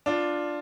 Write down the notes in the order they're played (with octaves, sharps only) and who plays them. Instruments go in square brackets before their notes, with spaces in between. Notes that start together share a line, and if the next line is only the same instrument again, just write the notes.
[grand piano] D4 F4